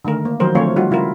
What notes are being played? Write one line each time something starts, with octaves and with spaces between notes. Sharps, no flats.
D3 D#3 A3 A#4
A#3
D#3 F3 F#3 A#4 C5
D3 F3 A3 C4 F4 C#5
G3 D#4 F4 F#4
C#3 E4 F4 A#4